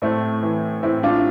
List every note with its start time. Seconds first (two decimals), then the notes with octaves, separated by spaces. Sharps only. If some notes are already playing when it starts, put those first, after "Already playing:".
0.02 A2 A3 C4
0.43 E3
0.83 A2 C4 E4
1.03 D4 F4